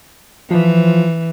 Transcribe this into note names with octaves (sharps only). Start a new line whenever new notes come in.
E3 F3